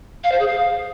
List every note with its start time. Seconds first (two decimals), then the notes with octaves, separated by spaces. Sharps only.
0.24 F5
0.32 C5
0.40 G#4
0.48 F5